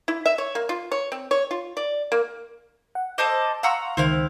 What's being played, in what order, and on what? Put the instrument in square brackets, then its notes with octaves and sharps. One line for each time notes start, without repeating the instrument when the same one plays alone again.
[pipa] E4
E5
C#5
A#3
F4
C#5
C4
C#5
F4
D5
A#3
[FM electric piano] F#5
[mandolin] A4 C5 D#5 [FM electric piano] D6
[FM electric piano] F5 C6 C#6 [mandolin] F#5 A#5 E6
[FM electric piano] C#2 D#3 [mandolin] C4 E4 F5